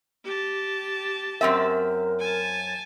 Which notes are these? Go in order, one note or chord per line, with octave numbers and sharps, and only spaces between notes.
G4 A5
F#2 C4 A#4 E5
G#5 A5